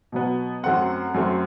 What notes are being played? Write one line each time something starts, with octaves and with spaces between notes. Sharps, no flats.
B2 F#3 B3
F#2 F#3 A3 C4 F#5
F#2 F#3 A3 C4